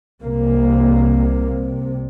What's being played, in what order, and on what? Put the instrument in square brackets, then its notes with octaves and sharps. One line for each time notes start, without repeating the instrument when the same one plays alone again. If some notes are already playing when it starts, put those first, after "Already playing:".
[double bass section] C2 C3 A#3